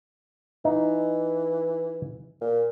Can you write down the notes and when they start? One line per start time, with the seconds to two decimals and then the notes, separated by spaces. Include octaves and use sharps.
0.65 E3 D#4
2.41 A#2